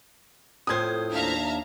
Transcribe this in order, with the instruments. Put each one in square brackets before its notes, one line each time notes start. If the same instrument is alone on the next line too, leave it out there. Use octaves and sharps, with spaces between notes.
[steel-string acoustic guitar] F2 A2 C5 [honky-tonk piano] D#6 G#6
[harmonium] D#2 D4 [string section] E5 F5 A#5